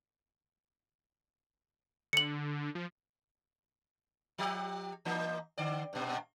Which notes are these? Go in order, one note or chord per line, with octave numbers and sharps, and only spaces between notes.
D3 C#7 F#7
F3
F3 G4
E3 A#3 D#4
D3 D5
G2 A#2